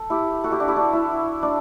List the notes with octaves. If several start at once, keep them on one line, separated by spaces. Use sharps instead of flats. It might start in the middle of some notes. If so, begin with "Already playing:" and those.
Already playing: A4
E4 G4
F#4 A4
E4 G4
D4 F#4
E4 G4
D4 F#4
E4
D4